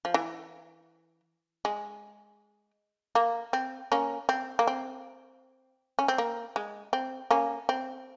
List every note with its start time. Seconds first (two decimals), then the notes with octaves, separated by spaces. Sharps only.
0.05 F3
0.14 E3
1.65 G#3
3.15 A#3
3.53 C4
3.92 A#3 C#4
4.29 C4
4.59 A#3
4.67 C4
5.99 C#4
6.08 C4
6.18 A#3
6.56 G#3
6.93 C4
7.31 A#3 C#4
7.69 C4